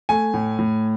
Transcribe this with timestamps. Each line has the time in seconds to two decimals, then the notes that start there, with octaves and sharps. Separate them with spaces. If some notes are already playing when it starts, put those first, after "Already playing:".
0.09 A3 G#5
0.34 A2
0.59 A2